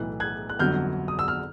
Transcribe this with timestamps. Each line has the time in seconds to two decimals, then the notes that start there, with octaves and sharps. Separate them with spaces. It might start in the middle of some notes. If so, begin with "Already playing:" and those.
Already playing: B1 A2 E3 F#6
0.20 F#6 G#6
0.49 F#6
0.59 G1 F2 D3 F#3 F6 G6
1.08 D#6
1.19 E6
1.28 F6